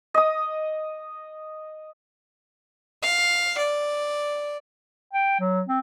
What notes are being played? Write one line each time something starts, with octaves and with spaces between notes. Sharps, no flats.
D#5 D#6
F5
D5
G5
F#3
C4